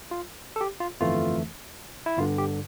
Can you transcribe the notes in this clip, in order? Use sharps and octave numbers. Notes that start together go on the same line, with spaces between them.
F4
A4
G4
F4
G1 F2 E3 A3 F4
E4
G1 G2 D3 F4
G4